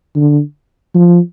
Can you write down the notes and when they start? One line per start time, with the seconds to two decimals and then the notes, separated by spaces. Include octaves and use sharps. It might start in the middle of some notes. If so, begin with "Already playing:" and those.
0.16 D3
0.95 F3